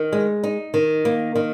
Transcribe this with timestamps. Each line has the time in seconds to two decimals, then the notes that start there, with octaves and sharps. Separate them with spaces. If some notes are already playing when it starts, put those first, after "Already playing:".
Already playing: D#3
0.12 G#3
0.44 D#4
0.74 D#3
1.05 A#3
1.35 D#3